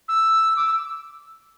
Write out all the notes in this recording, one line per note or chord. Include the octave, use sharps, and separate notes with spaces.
E6
D6
E6